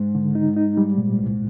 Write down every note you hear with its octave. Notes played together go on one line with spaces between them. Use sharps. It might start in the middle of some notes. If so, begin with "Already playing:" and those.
Already playing: G#2
D3
D#4
D#4
G3
A#2
C2